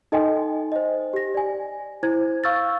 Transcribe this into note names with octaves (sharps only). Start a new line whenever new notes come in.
D#4 A4 D#5 G5 G#5 C6
C5 D#5
G4 A#6
D5 G#5
E4 C5 G#6
F5 C#6 E6 F6 G6 A6